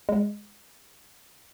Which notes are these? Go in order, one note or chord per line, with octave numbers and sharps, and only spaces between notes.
G#3